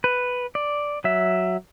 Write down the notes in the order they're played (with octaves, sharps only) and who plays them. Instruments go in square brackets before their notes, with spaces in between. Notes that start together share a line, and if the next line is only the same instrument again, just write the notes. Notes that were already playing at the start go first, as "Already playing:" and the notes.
[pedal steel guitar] B4
D5
F#3 E5